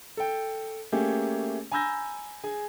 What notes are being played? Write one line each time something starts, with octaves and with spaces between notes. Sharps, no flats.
A4 G5
A3 A#3 C#4 G4 G#4
G#5 A#5 B5 E6 G6 A#6
G#4 G#5